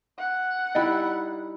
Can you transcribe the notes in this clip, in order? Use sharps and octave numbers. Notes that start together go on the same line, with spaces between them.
F#5
G3 D#4 E4 D#5 G5